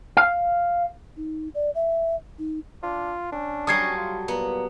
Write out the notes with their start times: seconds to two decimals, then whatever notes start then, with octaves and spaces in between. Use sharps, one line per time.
0.17 F5
1.17 D#4
1.55 D5
1.75 E5
2.39 D#4
2.83 D4 F4
3.32 C#4 D4
3.67 F#3 G3 C#4 A4 D#6 G#6 C7
3.97 F4
4.28 A#2 B3 A#5